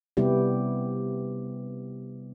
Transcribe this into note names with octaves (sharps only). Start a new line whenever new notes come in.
C3 G3 B3 E4 G4